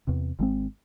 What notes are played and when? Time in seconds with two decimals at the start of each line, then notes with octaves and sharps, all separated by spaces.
0.07 E2 C3
0.39 G#1 G#3 C4